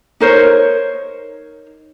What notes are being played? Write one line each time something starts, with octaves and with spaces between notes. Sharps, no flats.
D#4 A#4 C5 C#5